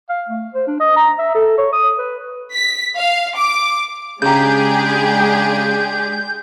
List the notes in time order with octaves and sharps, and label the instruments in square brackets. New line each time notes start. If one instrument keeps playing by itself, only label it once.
[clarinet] F5
A3
C5
D4
D#5
A#5
E5
A4
C#5
D#6
B4
[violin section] B6
F5
D6
[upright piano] C#3 A#5 [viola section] G#3 [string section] D4 G4 G#4 [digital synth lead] G6